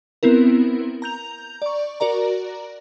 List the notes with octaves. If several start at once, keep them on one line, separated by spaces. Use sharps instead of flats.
B3 C4 E4 A#4
A#5 G6 F7
D5 C#6
F#4 A#4 D5 A#5